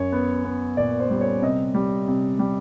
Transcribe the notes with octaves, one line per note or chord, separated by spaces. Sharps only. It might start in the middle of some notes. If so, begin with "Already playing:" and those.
Already playing: F#2 C#5
B3
B3
A#2 D5
C5
G3
C#5
C3 D#5
G3
C3
G3